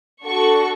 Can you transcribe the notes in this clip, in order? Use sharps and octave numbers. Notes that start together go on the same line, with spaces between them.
D4 F#4 A4 C#6